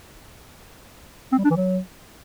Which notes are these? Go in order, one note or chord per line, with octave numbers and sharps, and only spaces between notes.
C4
G3
D4
E3
F#3